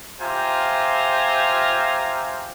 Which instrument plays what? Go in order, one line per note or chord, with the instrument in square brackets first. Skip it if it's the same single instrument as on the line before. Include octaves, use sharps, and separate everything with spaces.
[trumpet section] F4 G4 C5 E5 G#5 A#5